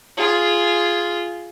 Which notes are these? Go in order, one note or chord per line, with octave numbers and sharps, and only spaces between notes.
F4 G#4